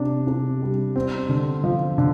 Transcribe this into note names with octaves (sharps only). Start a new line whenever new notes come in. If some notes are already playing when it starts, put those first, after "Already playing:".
Already playing: C3 D4
C3
G3
C4
D3
F3
D3